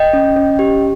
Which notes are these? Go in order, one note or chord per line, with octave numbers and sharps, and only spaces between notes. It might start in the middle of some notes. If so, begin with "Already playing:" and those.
Already playing: D#5 G5
C#4
C#4
G4